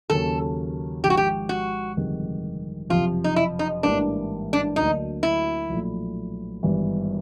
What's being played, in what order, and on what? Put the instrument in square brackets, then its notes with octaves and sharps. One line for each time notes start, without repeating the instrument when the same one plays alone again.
[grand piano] D#2 C#3 F#3 A#3 C#4 [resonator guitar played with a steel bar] A4
[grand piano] G#1 G#2 F3 [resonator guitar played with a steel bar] G4
[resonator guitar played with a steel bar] F#4
G4
F#4
[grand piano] G1 F2 C3 D#3 G#3
[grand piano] F#1 F2 C3 F3 [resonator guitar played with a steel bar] F4
[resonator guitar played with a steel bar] D#4
E4
D#4
[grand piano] A1 G#2 E3 G3 A#3 [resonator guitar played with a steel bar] D4
[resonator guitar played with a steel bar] D4
[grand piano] D2 D3 F#3 A#3 [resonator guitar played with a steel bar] D#4
[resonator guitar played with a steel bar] E4
[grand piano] B1 A#2 F3 A3
G#1 G2 E3 G3 B3